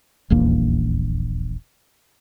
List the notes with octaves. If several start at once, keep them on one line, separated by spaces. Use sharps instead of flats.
D#1 A#1 E2 A#3